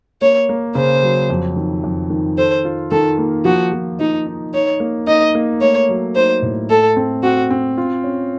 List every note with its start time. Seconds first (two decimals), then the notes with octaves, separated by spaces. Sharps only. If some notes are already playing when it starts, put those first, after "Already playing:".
0.21 A#3 C#5
0.49 A#3
0.75 C#3 C5
1.03 F#3
1.30 F2
1.56 D#3
1.84 F2
2.10 D#3
2.38 A4 C5
2.65 F4
2.91 D#3 A4
3.18 A#3
3.45 F3 F#4
3.73 F3
4.00 F3 D#4
4.26 D#4
4.54 D#4 C#5
4.80 A#3
5.07 D#4 D#5
5.35 A#3
5.61 A3 C#5
5.89 F#3
6.15 D#4 C5
6.42 A2
6.69 A3 A4
6.97 C4
7.23 C4 F#4
7.50 C4
7.78 F4
8.04 C#4